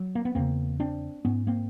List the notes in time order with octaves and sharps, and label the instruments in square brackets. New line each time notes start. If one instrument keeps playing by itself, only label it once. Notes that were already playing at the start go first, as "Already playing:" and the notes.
Already playing: [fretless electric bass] F#3
A#3
B3
E2 C#3 A#3 C4
C4 D4
G#2 B3 C#4
A#3 C4